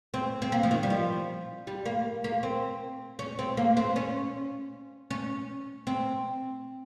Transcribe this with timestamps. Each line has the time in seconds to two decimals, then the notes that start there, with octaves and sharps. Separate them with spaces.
0.14 C4
0.42 C4
0.52 A#3
0.63 F3
0.71 D#3
0.83 G3
0.90 F3
1.67 G3
1.85 A#3
2.24 A#3
2.43 C4
3.19 C#4
3.39 C4
3.57 A#3
3.77 C4
3.96 C#4
5.10 C#4
5.87 C4